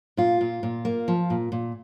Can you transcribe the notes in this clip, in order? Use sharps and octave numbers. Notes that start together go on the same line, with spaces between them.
A#2 F4
A#2
A#2
A#3
F3
A#2
A#2